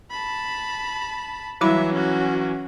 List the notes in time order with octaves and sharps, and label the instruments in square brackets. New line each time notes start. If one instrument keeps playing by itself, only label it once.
[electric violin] A5 B5
[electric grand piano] E3 F#3 [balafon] G3 E4 B5 [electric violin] E5
[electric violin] C#4 F#4